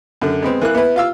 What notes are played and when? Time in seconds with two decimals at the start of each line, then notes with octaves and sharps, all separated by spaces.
0.21 F#2 D3
0.42 G#3 B3 C4
0.62 E3 A#3 F#6
0.75 B3 E4 B4
0.96 F4 F5 E6